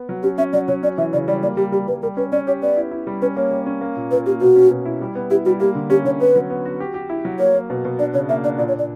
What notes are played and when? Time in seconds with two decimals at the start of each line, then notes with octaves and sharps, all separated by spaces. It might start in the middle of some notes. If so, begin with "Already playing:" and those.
Already playing: B3
0.09 F#3
0.23 C#4 G4
0.38 C#4 E5
0.53 F#3 D5
0.68 F#3 C#5
0.83 C#4 D5
0.98 E3 E5
1.13 C#3 D5
1.28 G3 D5
1.43 A#3 D5
1.57 G3 G4
1.72 G3 G4
1.87 G3 B4
2.02 G3 A#4
2.17 C#4 B4
2.32 C#4 D5
2.47 G4 C#5
2.62 B3 D5
2.77 E4
2.91 E4
3.07 G3
3.22 C#4 B4
3.36 A#3 C#5
3.51 G3
3.66 C#4
3.81 A#3
3.96 A#2
4.11 A#2 B4
4.26 A#3 G4
4.41 B2 F#4
4.56 C#4
4.71 B2
4.85 E4
5.01 G3
5.15 B3
5.31 E4 G4
5.45 G3 F#4
5.60 A#3 G4
5.75 D3
5.90 C#4 G4
6.05 D3 C#5
6.20 B3 B4
6.36 F#3
6.50 B3
6.65 F#4
6.80 G4
6.94 G4
7.09 E4
7.25 F#3
7.39 A#3 C#5
7.54 A#3
7.70 B2
7.85 B2
7.99 D4 D5
8.14 C#3 C#5
8.29 A#3 E5
8.44 D4 D5
8.58 A#2 D5
8.68 C#5
8.74 A#2
8.79 D5